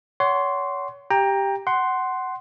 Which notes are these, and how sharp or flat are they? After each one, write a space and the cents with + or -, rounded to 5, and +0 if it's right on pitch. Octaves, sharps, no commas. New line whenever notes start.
C#5 +30 F#5 +20 C6 +0
G4 +0 G5 +20 A#5 +0
F#5 +15 C6 +0